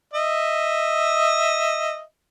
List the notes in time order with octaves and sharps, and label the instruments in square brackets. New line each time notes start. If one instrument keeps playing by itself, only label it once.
[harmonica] D#5 E5